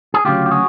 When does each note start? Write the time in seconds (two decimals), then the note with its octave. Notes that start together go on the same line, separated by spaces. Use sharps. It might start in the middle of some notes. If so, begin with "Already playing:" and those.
0.14 G#4
0.25 D2 C#3 F#3 F4 G4
0.46 G4
0.51 F#4 G#4